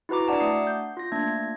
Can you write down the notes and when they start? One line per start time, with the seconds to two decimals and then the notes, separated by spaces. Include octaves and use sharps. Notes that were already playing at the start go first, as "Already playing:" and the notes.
0.09 E4 F#4 B4 A#5 D6
0.27 D4 D5 F#5 A5 D6
0.40 A3 D#6 C7
0.67 G6
0.97 F4 A#6
1.12 A3 A#3 D4 G#6 A#6